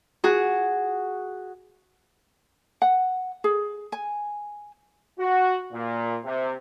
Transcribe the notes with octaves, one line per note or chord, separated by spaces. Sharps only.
F#4 G#4
F#5
G#4
G#5
F#4
A#2
C3